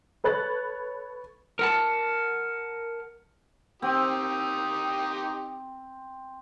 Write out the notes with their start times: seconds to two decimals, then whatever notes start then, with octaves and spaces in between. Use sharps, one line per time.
0.24 A4 B4 C#5 F#6 A6
1.59 A#4 F#5 A5
3.82 C4 D#4 G4 D#6